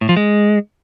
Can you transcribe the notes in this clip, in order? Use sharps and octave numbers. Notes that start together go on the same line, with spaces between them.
A2
F3
G#3